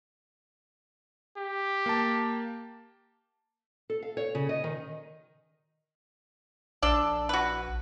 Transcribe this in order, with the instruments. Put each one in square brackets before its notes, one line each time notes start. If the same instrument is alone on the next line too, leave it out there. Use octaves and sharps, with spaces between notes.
[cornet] G4
[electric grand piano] A#3 A5
[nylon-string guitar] A4
F5
C#5
C#3
D#5
D#3
[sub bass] A#1 [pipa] D4 A4
[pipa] F#4 B4